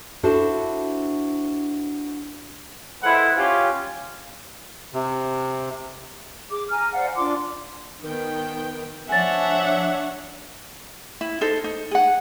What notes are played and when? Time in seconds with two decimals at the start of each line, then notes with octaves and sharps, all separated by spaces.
0.23 D4 E4 F#4 A4 C5
3.02 G#3 E4 A4 B4 C5 F#5
3.36 C#4 F4 G4
4.94 C3
6.51 G#4 D6
6.70 G#5 A#5 F6
6.93 C5 D5 F5 F#5
7.16 D4 F4 C6 D6
8.02 D#3 B3 G5
9.09 F3 D4 C#5 E5 F#5 G#5 A6
11.21 E4
11.41 D#4 A4 C5
11.64 D#4
11.91 G#4 F#5